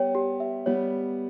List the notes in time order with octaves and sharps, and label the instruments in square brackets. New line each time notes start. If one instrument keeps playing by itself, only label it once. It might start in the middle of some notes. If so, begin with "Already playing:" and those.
Already playing: [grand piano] G3 B3 [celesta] C#5 G5
[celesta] G4
E5
[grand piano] G3 B3 [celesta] C#5